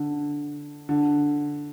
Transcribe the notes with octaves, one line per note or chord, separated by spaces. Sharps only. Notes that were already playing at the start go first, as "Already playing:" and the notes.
Already playing: D3
D3